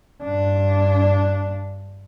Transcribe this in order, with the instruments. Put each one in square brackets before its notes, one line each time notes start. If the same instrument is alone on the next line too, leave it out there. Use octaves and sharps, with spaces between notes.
[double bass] G2 D4